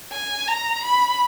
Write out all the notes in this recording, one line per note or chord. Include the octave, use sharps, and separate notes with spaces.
G#5
A#5
B5